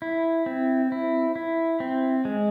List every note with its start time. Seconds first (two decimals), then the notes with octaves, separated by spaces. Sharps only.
0.02 E4
0.46 C4
0.92 E4
1.36 E4
1.80 C4
2.25 G#3